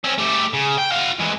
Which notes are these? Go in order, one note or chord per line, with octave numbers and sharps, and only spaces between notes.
C4 C#4
A3 G4
C#3
G5
F#4 F5
G#2 E3